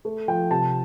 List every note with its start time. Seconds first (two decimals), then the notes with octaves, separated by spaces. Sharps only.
0.05 A3
0.28 F3 G5
0.51 C3 A5